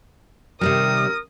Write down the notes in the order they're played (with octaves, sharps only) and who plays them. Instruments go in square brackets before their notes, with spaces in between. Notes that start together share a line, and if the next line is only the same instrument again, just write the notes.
[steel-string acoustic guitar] C3 D#3 G3 [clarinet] A#4 [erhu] D#6